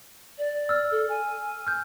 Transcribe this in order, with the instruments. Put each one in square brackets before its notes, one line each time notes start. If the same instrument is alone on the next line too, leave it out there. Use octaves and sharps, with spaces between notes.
[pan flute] D5
[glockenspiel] E6 F6
[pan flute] A4
G#5
[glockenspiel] F6 G6